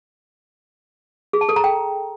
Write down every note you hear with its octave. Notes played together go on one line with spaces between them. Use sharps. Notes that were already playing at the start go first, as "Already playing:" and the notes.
G#4
A5
A4
A#5
G5